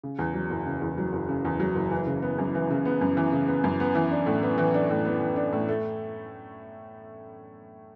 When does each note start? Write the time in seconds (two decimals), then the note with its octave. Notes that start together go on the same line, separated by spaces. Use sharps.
0.03 C#3
0.19 E2
0.34 F#3
0.50 F#1
0.66 C#3
0.82 E2
0.98 F#3
1.13 F#1
1.29 C#3
1.45 E2
1.60 F#3
1.76 F#1
1.91 E3
2.07 C#3
2.22 B3
2.38 F#2
2.55 E3
2.70 C#3
2.85 B3
3.01 F#2
3.17 E3
3.32 C#3
3.48 B3
3.64 F#2
3.80 B3
3.95 E3
4.11 D4
4.26 A2
4.43 B3
4.58 E3
4.74 D4
4.90 A2
5.05 B3
5.21 E3
5.36 D4
5.53 A2
5.69 A3